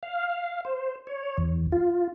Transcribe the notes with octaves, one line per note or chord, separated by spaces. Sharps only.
F5
C5
C#5
E2
F4